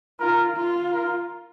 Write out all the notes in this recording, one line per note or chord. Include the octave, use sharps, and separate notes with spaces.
F4 A#4
F4
A#4